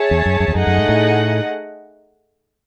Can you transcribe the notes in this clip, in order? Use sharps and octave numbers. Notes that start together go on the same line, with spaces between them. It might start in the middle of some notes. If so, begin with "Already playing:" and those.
Already playing: G#4 C#5 E5 A5
E2
F#2
F#2
E2
F#2 A3 D#4 G#4 D#5 F#5
F#2
G#2
A2